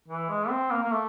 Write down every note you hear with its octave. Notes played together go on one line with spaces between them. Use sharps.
E3
G#3
C4
A#3
A#3
A3